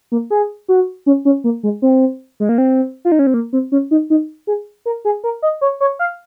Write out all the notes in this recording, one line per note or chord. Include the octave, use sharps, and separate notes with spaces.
A#3
G#4
F#4
C#4
C#4
A#3
G#3
C4
G#3
A#3
C4
F4
D#4
C#4
C4
A#3
C4
C#4
D#4
D#4
G#4
A#4
G#4
A#4
D#5
C#5
C#5
F5